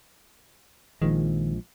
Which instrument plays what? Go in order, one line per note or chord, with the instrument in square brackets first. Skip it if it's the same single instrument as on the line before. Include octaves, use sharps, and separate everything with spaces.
[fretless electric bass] A#1 F3 G#3 [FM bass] D#3